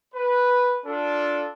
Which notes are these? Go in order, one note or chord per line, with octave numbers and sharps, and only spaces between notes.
B4
D4 F4 A4